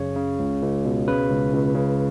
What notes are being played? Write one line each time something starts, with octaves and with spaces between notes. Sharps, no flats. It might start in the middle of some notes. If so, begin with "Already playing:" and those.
Already playing: F#2 C#3 C#5
C#3
C#2
C#2
B2
C#3 B4
C#2
C#2
C#3